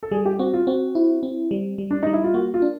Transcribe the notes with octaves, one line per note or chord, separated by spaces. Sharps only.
A4
G3 G#4
G4
C4 F#4
F4
C4 F#4
E4
C4
G3
G3
D4
G3 D#4
E4
F4
A#3 F#4
F4
D4